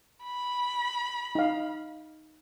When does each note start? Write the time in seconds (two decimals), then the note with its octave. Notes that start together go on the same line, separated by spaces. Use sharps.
0.24 B5
1.35 D#4 F5